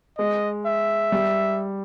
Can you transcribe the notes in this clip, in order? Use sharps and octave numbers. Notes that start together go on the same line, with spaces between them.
G#3 D#5
E5
G3